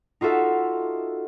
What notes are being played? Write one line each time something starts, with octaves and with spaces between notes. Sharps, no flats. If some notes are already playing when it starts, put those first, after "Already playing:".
D#4 F4 F#4 A4 E5